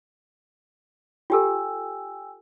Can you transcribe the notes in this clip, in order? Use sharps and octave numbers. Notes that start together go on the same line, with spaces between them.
F4 G4 A4 G5 G#5 E6